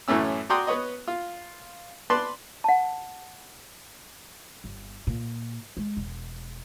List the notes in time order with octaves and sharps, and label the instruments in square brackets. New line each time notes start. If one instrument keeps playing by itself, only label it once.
[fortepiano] F#2 A2 E3 A3 C#4 E6
F#4 D5 G5 A#5 C6 D#6
B3 B4 C#5 D#5
F4
B4 D5 A5 C6
[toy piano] F#5 A5
[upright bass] G1
A#2
G#3
E1